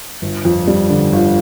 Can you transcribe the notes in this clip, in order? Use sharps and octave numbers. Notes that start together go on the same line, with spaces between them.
G1
F2
G3
D3
G1